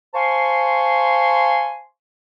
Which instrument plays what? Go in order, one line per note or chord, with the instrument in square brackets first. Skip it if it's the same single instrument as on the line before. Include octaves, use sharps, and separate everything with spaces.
[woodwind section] C5 F5 G#5 A5 C6 C#6